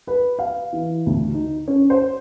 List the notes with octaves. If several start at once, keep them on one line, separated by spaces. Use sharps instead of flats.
B4
F5
E3
D2
D#4
C#4
C5